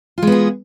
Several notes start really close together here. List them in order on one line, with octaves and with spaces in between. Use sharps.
F4 G#3 B3 G#4